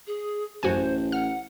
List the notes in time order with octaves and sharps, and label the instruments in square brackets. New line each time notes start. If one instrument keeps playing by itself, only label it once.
[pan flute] G#4
[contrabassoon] A1 [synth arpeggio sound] F#2 F#4 G#5 [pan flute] C5
[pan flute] F#5 [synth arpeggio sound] F6